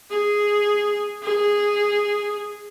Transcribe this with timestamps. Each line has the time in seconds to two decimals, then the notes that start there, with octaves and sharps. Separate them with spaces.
0.10 G#4
1.23 G#4